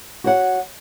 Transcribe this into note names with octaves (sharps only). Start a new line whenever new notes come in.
F#4 C#5 F#5